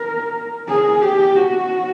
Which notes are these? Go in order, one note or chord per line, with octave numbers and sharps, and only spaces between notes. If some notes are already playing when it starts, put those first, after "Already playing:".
Already playing: A#4
G#4
G4
F#4